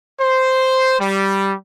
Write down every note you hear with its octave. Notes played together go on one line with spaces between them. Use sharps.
C5
G3